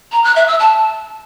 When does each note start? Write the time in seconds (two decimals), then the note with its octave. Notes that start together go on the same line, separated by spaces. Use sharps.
0.12 A#5
0.24 F#6
0.36 E5
0.48 E6
0.59 A5